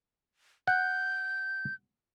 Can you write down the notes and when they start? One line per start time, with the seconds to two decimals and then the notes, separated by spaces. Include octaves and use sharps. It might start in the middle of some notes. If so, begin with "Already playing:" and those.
0.68 F#5 G6